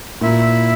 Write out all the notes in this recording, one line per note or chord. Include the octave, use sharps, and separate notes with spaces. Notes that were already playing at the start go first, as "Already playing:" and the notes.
A#2 E4